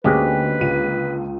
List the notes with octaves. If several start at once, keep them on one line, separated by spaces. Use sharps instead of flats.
D2 D3 G#3 A#3 C#4 G4 G#4 B4
C#2 D#7